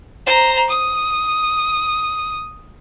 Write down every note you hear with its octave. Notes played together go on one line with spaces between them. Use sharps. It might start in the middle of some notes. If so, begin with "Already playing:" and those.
C5 A#5
D#6